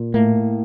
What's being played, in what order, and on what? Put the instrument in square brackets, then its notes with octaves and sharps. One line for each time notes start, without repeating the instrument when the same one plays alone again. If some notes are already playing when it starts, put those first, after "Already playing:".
Already playing: [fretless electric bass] A#2
[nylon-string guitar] A2 [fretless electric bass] A#3